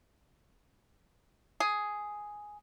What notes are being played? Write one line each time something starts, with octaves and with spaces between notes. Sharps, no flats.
G#4